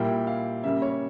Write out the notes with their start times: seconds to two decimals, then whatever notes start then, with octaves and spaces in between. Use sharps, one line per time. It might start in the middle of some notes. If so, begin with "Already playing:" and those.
Already playing: A#2 G3 A#3 E4 G5
0.27 F5
0.64 C#3 G3 A#3 E5
0.82 C#5